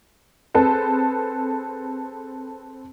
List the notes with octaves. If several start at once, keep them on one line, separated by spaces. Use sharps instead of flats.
C4 G#4 A4 B4